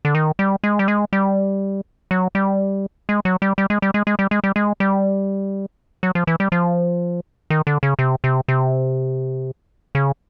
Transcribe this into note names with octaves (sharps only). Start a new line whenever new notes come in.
D3
D#3
G3
G#3
G3
G#3
G3
F#3
G3
G#3
F#3
G3
G3
G#3
G3
G#3
G#3
G3
G#3
G3
G#3
G3
F#3
F3
E3
G3
F3
D#3
D3
C#3
C3
C3
C3
C#3